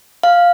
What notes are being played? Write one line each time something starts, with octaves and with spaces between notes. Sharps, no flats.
F5